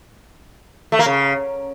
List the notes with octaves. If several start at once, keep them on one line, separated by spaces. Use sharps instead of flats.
A3
A#3
C#3